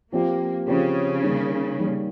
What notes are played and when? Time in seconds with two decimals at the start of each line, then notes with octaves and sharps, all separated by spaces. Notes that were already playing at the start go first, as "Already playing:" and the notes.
0.12 F3 A#3 C4 G4 C5
0.68 C#3 F3 C4 G4 C5
1.23 D#3 G3 A#3
1.79 D#3 G3 A#3